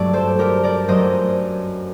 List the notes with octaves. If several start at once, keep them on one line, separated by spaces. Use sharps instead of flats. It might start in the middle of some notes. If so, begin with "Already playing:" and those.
Already playing: G2 F#3 A3 D5
A4 C5
G4 A#4
A#4 D5
F#2 F#3 A3 C5 D#5